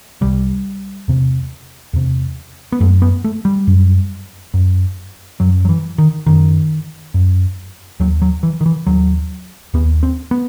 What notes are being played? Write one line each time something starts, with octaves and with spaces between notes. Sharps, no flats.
C2 C3 G3
E2 C3
E2 C3
B3
F#2 A3
B3
A3
G3
F#2
F#2
F#2 F#3
F#3
E3
D#3
F#2 D#3
F#2
D#2 F#3
F#3
E3
D#3
E3
D#2 F#3
D#2 B3
C4
B3